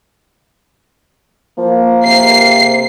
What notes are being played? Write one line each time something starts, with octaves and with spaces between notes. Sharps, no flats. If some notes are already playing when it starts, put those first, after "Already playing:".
F3 A#3
C3 C7